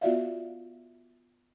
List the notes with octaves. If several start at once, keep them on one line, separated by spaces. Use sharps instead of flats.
B3 F4 F#4 D5 E5 F5